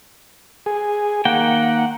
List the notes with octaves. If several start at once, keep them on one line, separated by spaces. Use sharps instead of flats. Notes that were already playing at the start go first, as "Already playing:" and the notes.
G#4
D#3 A#3 F#5 G5